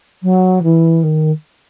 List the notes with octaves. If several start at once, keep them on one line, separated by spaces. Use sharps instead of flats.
F#3
E3
D#3